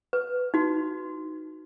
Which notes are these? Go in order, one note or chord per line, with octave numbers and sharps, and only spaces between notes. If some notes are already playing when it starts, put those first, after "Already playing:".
B4
D#4 F#4